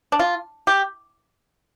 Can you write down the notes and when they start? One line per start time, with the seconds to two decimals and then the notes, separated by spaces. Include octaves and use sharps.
0.12 D4
0.19 F4
0.67 G4